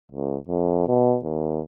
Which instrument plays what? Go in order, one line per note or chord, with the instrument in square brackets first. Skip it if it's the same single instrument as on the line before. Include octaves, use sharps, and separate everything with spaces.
[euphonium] C#2
F2
B2
D#2